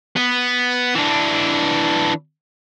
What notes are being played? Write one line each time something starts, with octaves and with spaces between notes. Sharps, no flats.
B3
E3 D4